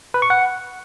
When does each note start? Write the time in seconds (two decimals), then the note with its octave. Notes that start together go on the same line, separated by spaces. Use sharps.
0.14 B4
0.22 C#6
0.30 F#5